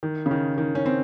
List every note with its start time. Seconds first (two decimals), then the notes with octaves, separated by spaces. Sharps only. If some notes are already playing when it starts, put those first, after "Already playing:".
0.03 D#3
0.26 C#3
0.31 D#3
0.58 D#3
0.75 C#4
0.86 C4